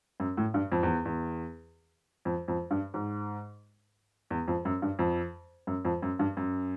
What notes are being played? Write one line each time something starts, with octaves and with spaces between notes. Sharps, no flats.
F#2
A2
G2
F2
E2
E2
F2
F2
G2
G#2
E2
F2
F#2
G2
F2
F#2
F2
F#2
G2
F#2